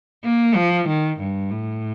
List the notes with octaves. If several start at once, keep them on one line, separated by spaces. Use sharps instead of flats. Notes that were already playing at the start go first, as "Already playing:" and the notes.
A#3
F3
D#3
G2
A2